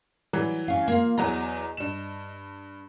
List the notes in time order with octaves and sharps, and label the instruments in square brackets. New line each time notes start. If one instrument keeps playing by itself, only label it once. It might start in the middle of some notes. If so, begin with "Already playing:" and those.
[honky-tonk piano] E3 F#3 G3
[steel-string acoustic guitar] C#4 F5
A#3 F4
[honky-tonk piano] E2 F#3 A#5 [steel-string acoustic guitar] D#5
[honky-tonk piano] G2 E7